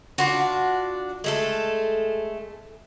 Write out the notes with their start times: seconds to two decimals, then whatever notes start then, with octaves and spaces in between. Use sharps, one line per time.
0.18 D4 F4 F#4
1.24 G#3 A3 A4